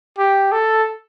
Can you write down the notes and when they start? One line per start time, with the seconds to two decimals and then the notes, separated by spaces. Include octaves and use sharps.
0.18 G4
0.52 A4